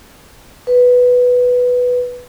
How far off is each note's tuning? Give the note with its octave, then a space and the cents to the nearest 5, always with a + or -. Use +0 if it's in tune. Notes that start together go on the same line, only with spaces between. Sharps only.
B4 +0